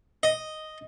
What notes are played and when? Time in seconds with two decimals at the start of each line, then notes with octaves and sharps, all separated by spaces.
0.23 D#5